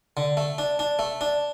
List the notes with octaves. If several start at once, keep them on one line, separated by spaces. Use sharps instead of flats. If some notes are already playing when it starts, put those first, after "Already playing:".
D3
A3
D4
D4
A3
D4